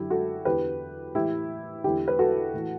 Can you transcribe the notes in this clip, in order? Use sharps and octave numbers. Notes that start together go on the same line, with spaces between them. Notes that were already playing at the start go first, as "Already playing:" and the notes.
Already playing: F#2 D3 E4 G4
F#4 A4
E2 D3 G4 B4
A2 E3 E4 G4
E2 D3 E4 G4
B4
F#4 A4
A2 E3